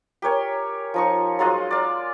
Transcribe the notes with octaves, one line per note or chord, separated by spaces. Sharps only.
G4 A#4 C#5 G#5
F3 D#4 C#6
F#3 G#3 F4 D#5
D5 F5